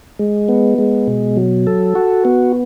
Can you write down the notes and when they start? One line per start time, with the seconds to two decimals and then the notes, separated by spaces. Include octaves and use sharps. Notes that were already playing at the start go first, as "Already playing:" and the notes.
0.19 G#3
0.49 B3
0.78 G#3
1.07 B2
1.37 F#3
1.67 A4
1.95 F#4
2.25 B3